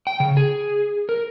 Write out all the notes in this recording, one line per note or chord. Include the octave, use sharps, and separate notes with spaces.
G5
C#3
G#4
A#4